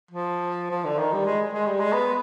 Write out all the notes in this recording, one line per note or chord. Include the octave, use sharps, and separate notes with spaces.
F3
F3
D3
D#3
G3
G#3
G#3
G3
G#3
B3